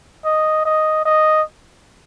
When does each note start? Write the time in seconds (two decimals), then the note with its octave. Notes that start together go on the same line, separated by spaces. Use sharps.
0.25 D#5
0.65 D#5
1.06 D#5